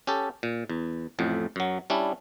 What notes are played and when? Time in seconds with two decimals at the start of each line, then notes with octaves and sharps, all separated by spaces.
0.07 C#4 G4 A4
0.43 A#2
0.70 E2
1.19 A1 F2 A2
1.56 F#2 F#3
1.90 G3 C#4 D4 E4